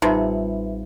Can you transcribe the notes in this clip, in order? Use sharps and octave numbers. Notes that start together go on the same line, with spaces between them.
A1 C3 G3 D#4 F4 B4 E5 B5